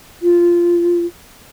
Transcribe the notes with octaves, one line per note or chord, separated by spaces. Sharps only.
F4